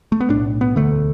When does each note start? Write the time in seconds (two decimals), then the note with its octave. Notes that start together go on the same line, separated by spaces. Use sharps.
0.12 A3
0.20 B3
0.29 B1 A2 D4
0.61 B3
0.76 E1 D2 D3 A3